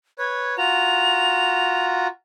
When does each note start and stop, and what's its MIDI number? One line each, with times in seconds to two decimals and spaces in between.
0.19 0.56 71
0.19 0.56 73
0.19 0.56 92
0.58 2.08 65
0.58 2.08 66
0.58 2.08 82
0.58 1.86 101